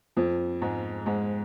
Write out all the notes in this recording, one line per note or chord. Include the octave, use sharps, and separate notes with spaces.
F2 F3
G#2 G#3
G#2 G#3